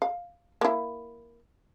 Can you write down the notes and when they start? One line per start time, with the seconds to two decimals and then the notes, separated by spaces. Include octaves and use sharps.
0.02 F5
0.61 A#3 E4